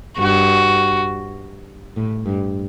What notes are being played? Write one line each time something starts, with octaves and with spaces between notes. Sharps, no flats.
G2 F#4
A2
G2